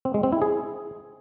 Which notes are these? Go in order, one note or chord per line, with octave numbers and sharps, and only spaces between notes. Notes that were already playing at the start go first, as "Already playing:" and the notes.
C4
G#3
C4
E4
G#4